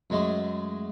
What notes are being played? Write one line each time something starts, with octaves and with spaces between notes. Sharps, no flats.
F#2 G#3 A3